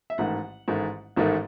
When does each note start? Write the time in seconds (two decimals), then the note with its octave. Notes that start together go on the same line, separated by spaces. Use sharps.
0.10 E5
0.18 A1 G#2 D#3 A3 F#5
0.68 A1 G#2 D#3 A3
1.16 A1 G#2 D#3 A3